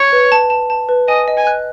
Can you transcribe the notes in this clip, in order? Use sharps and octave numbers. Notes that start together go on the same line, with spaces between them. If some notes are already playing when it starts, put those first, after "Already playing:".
Already playing: C#5
B4
A5
A5
A5
B4
D#5 G#5
D#5
G#5
F#6